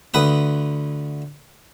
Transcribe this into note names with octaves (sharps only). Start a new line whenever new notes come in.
D2 B4 D#6